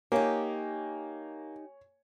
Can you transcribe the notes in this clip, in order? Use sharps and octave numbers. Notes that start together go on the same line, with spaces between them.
A#3 D#4 G4 C#5 G#5